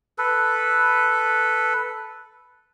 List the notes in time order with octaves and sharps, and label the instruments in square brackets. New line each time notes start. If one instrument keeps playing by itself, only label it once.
[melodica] A4 B4